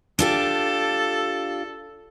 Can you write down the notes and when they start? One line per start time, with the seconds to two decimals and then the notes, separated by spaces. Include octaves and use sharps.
0.19 D4 F4 G4 A4